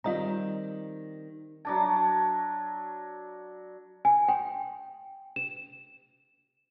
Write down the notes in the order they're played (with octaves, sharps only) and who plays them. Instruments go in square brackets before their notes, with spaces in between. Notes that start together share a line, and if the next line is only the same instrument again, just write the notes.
[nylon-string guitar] D#3 G3 C4 [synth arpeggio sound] F4 D#5 A#5
[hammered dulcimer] F#3 D4 A5
[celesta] G#5
G5
E7